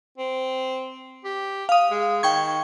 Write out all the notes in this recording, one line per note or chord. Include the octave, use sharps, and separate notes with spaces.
C4
G4
F5 D#6
G#3
D#3 G5 C#6 G#6